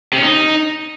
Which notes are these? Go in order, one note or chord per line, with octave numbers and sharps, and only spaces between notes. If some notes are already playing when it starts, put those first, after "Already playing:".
C3
C#4
D#4